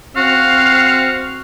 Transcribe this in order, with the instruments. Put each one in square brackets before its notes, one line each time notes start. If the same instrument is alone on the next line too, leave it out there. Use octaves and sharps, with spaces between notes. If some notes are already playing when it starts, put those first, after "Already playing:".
[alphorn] C4 [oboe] F#4 [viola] F5